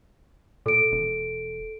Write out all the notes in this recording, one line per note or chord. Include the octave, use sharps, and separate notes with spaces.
A#2 A4 D7
E1